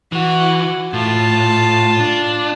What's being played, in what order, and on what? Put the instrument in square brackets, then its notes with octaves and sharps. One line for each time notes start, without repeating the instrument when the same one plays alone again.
[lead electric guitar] E3 [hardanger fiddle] F#4
[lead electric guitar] A2 [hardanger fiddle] F4 A5
[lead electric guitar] D4